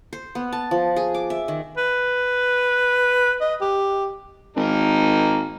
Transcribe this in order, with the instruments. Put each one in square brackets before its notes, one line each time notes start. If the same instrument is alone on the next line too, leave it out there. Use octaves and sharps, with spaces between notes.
[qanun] C5
B3
A5
F3
G#4
D6
E5
D#3
[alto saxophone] B4
D#5
G4
[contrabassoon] G#1 [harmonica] A#3 D#4 A#4